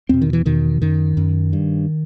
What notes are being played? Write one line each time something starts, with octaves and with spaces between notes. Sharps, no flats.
E2 B2 C4
D#3
E3
E2 B2 D#3
F#2 D#3
F#2
G2